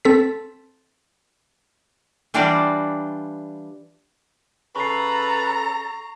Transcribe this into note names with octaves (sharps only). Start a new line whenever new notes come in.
C4 A4 B6
E3 G3 D4 F4 F#4 D5
C#3 A4 B4 A#5 C#6 C7